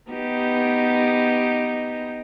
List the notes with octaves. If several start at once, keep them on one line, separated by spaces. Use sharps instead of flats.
B3 D#4 G4